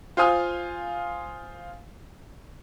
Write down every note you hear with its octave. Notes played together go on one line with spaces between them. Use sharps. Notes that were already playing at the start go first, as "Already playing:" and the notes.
F4 C5 F5 G#5 D#6 F6